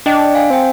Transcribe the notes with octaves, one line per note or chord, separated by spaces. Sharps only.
D4 D#5 G5
F5 G#5
C4 G5